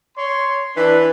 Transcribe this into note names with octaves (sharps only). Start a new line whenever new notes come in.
C#5 C6
E3 D4 B4